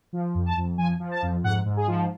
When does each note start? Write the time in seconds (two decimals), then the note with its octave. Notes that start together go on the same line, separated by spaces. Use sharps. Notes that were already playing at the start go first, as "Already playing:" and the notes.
0.13 F3
0.35 F2
0.46 A5
0.57 F2
0.78 F3 G#5
1.00 F3
1.11 A5
1.22 F2
1.44 G#2 F#5
1.65 G#2
1.77 G#4
1.88 F3